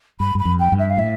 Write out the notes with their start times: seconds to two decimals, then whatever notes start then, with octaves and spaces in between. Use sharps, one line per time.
0.19 G2 B5
0.35 G2 B5
0.45 F2
0.59 G5
0.72 G2
0.78 E5
0.89 F5
0.97 A2 E5